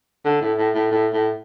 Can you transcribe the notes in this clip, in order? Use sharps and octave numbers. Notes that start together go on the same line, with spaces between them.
D3
A2
A2
A2
A2
A2